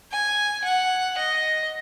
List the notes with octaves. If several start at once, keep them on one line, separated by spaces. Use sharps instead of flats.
G#5
F#5
D#5